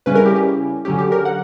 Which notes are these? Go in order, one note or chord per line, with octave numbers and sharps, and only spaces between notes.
C#3 G3 C#4 E4 B4
A#4
G4
G4
D3 F#3 C#4 G4
G4
A#4
F#5